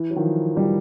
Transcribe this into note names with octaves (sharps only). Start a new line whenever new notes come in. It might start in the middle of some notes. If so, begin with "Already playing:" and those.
Already playing: E3
F#3
D#3 F3
F3 G3